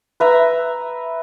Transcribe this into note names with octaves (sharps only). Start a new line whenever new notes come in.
B4 E5 A#5